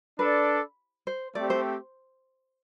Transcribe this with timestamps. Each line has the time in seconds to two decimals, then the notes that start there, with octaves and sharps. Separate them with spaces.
0.19 D4 A4 B4 D5
1.07 C5
1.35 A3 C4 G4 D5
1.50 C5